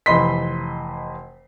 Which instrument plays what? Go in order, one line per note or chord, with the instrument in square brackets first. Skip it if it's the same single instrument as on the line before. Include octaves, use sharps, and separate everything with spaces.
[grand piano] F1 E3 D#5 B5 C6 B6